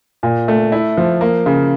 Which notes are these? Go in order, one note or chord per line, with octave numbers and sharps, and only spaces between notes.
A#2
A3
E4
F3
A#3
C#3